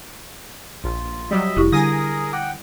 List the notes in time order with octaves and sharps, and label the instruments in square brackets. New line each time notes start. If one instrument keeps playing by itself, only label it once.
[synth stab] A#1 [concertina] F4
[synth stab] F#3 G3 [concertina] D#5 E5
[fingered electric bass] F1 [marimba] E4 G4 C#6
[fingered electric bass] D3 [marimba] G3 [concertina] G#4 A#4 [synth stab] G#5 D#6 A#6
[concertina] F#5 G5 [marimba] D6